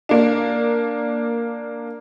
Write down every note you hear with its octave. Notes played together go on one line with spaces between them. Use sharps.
A#3 D4